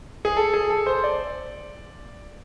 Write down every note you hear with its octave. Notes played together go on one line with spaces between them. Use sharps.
G#4
A4
G#4
A4
C5
D5